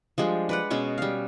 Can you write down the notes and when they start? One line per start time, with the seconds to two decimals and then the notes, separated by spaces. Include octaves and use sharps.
0.18 F3 G3 G#3 D4
0.49 B4 D5 F#5
0.70 B2 G#3 C#4 C#6
0.98 G3 F5